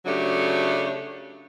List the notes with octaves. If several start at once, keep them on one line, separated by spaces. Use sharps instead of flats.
C#3 F#3 A3 D4 G4